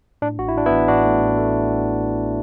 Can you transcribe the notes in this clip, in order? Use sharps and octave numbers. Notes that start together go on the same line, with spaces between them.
A2 D4
A1 F#4
E4
A2 D4
B3 E4
A1
A1 D4 F#4
A3
A2
A3